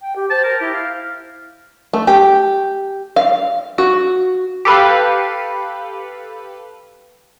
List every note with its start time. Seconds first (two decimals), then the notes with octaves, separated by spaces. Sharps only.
0.01 G5
0.16 G4
0.30 C5 A5
0.44 A#4
0.60 E4 G4
0.74 F5
1.93 A3
2.07 G4
3.16 F5
3.78 F#4
4.65 G4 A4 B4 F5